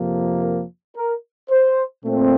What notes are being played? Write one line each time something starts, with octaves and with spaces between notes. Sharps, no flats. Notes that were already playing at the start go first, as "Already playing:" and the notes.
Already playing: F2 C3 F3 A#3
A#4
A#4
C5
A#2 A3 C4